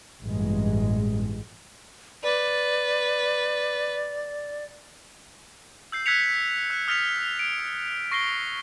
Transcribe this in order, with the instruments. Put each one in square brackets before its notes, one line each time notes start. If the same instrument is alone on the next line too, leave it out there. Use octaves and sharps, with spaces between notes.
[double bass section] A1 G2 B2 G#3
[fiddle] B4 [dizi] D5
[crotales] E6 G6 C7
E6 F#6 G#6 B6 C#7 F7
F#6
D#6 F6 A6 B6 C#7 F7
D7
C#6 A#6 C7 D7 G7